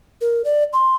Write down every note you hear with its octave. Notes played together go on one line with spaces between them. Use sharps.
A#4
D5
C6